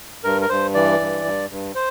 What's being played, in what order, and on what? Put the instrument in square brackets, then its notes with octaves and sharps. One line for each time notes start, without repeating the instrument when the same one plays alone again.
[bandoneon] G2 A#4
A#4
G2 C5
E3 D5
G2
G2
G2
C5